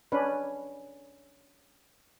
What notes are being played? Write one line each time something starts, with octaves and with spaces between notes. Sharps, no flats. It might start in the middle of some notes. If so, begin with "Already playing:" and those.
C#4 D4 B4